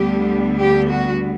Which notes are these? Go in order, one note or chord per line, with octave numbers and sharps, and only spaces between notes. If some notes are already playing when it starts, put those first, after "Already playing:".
Already playing: D2 D3 G3 B3 G4
G4
F#4